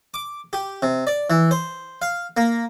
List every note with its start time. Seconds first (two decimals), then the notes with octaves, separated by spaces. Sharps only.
0.14 D6
0.53 G4
0.82 C3
1.07 D5
1.30 E3
1.51 C5
2.02 F5
2.37 A#3